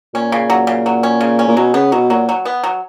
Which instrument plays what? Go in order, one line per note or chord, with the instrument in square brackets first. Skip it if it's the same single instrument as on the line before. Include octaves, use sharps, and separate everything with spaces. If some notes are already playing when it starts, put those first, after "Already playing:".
[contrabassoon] A#2 [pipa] C#4
[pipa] C#3
F#3
C#3
F#3
C#4
C#3
C#4
[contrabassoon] A#2
[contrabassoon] B2 [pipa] F#3
[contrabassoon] C#3 [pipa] B3
[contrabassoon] B2 [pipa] F#3
[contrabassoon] A#2 [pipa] F#3
[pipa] F#3
B3
F#3